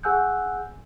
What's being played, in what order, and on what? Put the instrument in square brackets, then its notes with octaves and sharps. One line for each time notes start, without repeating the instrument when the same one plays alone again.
[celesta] G#4 F#5 G#5 E6 F#6 G6